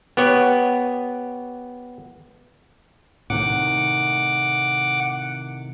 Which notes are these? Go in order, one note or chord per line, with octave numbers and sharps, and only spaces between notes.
B3 G4 C#5
A2 C3 D#3 F#5 D6